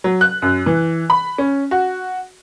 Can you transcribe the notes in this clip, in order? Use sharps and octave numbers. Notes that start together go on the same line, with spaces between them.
F#3
F#6
F#2
E3
B5
C#4
F#4